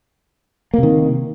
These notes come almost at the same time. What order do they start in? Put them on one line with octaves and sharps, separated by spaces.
A#3 C3 D#3